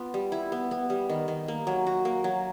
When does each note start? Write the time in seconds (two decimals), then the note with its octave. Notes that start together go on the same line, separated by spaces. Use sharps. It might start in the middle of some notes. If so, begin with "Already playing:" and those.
Already playing: B3 F4
0.14 G3
0.32 E4
0.52 B3
0.71 B3
0.90 G3
1.09 D#3
1.28 D#3
1.48 A#3
1.67 F#3
1.86 F#4
2.05 A#3
2.24 F#3